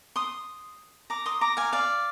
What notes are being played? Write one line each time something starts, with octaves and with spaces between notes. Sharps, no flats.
C6 D#6
A#5 D6
C6 D#6
A#5 D6
F5 G#5
D5 F5